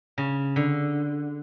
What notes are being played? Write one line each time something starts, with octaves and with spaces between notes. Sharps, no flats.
C#3
D3